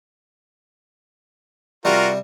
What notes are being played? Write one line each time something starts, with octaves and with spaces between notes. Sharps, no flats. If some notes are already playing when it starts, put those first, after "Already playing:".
C3 G3 F4 F#4 A#4